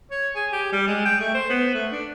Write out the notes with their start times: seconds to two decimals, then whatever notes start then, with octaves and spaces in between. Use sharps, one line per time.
0.11 C#5
0.35 G#4
0.53 G4
0.72 G3
0.87 G#3
1.05 G5
1.20 A3
1.34 C5
1.50 B3
1.74 A3
1.92 D4